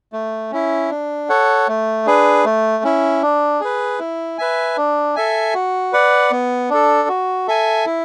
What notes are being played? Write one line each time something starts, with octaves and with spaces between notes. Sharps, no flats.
A3
C#4 E4
D4
A4 C#5 F#5
A3
D4 G#4 B4
A3
C#4 E4
D4
G#4 B4
E4
B4 E5 G#5
D4
A4 E5 G#5
F#4
B4 D5 F#5
B3
D4 A4
F#4
A4 E5 G#5
E4